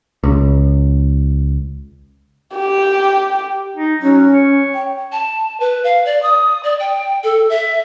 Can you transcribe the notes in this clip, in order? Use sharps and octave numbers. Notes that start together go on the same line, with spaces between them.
C#2
G4
D#4
F#3 C#4
C#5
G5
A5
B4
F5
D5
D#6
D5
G5
A4
E5